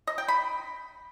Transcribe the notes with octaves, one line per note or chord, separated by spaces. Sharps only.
D#5
G5
B5